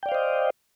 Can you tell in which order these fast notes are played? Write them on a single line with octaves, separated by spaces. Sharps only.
G5 D5 F5 C5 D#5